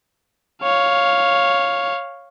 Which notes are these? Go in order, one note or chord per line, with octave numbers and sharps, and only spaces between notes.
C#5 F5